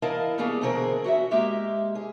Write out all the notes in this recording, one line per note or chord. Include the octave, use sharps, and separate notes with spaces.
E3 E4 A#4 D#5 F5 A5
G3 A#3 B3 C#4 G#4
B2 D3 E3 C4 G#4 A#4
C#4 F#4 D#5 E5
G#3 A#3 G4 E5
G#4